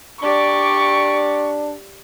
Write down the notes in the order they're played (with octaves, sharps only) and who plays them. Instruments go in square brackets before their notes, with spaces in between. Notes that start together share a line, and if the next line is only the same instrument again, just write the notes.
[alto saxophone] D4 [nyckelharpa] G4 D5 [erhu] C#6